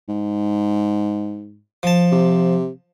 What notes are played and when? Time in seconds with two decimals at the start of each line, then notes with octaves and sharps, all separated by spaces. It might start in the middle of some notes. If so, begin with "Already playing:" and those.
0.08 G#2
1.83 F3 A5
2.12 C3